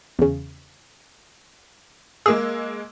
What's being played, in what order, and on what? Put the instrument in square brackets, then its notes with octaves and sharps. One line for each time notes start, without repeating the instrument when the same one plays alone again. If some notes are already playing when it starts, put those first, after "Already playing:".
[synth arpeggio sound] E2 C#3
[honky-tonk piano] G#3 A#3 E6 [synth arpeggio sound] G#4